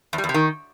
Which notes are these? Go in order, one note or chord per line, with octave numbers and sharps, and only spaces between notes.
E2
G3
E2
C3
D#3